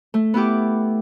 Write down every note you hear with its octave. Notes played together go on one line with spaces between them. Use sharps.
A3
B3 E4 G4 D6